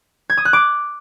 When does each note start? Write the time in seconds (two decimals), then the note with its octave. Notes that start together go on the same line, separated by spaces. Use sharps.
0.30 G#6
0.37 D#6
0.45 F#6
0.53 D6